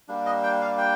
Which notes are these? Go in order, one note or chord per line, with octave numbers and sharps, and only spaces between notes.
G3 A#3 D4
D#5
G5
F5
G5